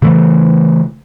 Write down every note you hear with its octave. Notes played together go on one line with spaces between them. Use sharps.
C#3 E3 A3